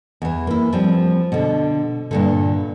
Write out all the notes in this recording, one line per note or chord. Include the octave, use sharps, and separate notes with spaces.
E2 E3
A#3 E4
F3 G3 C4
B2 D3
G2 A#2 D3